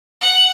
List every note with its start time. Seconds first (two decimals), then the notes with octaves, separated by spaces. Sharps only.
0.21 F#5